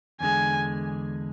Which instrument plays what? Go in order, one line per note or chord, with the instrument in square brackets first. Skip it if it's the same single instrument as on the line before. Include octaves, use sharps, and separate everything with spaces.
[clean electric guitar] E2 D3 G#3 [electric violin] G#5